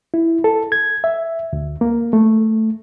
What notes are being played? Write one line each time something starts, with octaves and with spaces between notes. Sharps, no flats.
E4
A4
G#6
E5
D2
A#3
A3